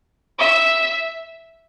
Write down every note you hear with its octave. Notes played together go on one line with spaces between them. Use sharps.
E5